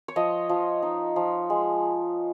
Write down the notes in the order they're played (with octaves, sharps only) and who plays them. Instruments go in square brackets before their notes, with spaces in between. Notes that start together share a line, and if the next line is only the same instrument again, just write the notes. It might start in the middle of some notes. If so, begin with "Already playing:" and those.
[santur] C#5
F3 D#5
F3
D#4
F3
G#3